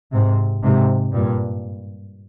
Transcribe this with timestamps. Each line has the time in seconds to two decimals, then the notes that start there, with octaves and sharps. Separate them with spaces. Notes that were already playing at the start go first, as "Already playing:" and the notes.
0.12 G#2 C3
0.63 G#2 C3
1.13 G2 A#2